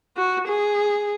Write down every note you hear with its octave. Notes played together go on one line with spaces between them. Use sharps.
F#4
G#4